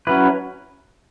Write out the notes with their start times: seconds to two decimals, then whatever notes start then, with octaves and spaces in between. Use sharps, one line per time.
0.07 F#3 C#4 E4 B4